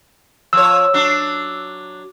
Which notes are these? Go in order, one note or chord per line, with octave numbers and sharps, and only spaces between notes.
F3 C#5 E6
F#3 D4